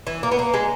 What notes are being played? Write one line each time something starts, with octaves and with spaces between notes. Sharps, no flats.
E3
A#3
B3
A#3
G#3